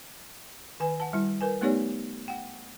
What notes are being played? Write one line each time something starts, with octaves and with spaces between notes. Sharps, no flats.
D#3 B4 G#5
F#5 A5
G3 E4
A#4 B4 G#5
A3 B3 D#4 G4 C#5 D5
F#5 G5